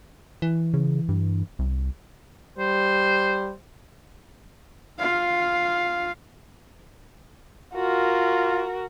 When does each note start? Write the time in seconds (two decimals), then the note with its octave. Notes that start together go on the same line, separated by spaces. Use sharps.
0.42 E3
0.74 C#3
1.09 G2
1.59 C2
2.58 G3 C5
4.99 F4 F5
7.74 F4 F#4 A#4